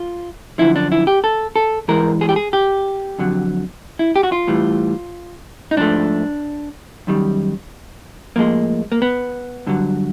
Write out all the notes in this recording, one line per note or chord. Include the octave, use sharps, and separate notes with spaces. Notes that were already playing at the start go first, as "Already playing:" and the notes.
Already playing: F4
F#2 D3 F3 E4
D4
E4
G4
A4
A4
G#2 E3 G#3 A#4
G#4
G4
G#4
G4
F2 D3 F#3
E4
G4
F#4
F4
A2 E3 G3
D#4
G#2 F3 A3 D4
F#2 D#3 G3
A2 F3 G#3 A#3
A#3
B3
G2 D3 F#3